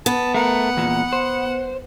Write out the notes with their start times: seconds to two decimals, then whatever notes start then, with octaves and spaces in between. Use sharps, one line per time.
0.06 B3 A5
0.34 A3 A#4 F#5
0.77 E2 A#2
1.13 C5